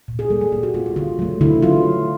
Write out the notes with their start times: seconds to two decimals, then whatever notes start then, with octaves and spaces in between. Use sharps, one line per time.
0.08 A#2
0.19 G#4
0.30 G3 A#3 A4
0.41 G#4
0.52 A#2 G4
0.63 F#4
0.74 G3 A#3 F4
0.86 F4
0.96 D3 F4
1.19 F#3 A3
1.41 D3 E4
1.62 F#3 F4